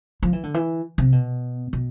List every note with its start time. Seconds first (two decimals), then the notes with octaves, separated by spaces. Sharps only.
0.23 F3
0.33 E3
0.43 D3
0.54 E3
0.98 C3
1.12 B2
1.73 B2